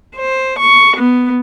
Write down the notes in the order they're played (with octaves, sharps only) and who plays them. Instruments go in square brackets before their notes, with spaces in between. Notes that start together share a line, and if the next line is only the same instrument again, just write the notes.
[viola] C5
C#6
B3